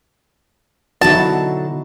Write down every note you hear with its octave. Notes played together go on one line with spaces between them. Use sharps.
B2 D3 F#3 D#4 E4 F#4 A5